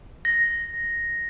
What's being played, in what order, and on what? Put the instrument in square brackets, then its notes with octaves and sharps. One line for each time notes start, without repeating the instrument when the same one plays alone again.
[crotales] A#6